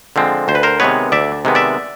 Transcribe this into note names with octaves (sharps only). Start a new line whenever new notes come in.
D3 F3 G#3 C4
D2 C5
B4
A#4 C5
C3 D#3 G#3 B3 B4 C#5
D2 D5 E5
C3 D#3 G#3 B3
D5 E5